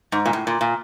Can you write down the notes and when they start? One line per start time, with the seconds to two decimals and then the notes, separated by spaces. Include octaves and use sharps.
0.12 G#2
0.26 A#2
0.33 A2
0.47 A#2
0.61 A#2